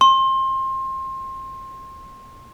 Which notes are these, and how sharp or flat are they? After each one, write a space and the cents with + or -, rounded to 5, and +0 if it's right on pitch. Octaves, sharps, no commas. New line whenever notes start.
C6 +25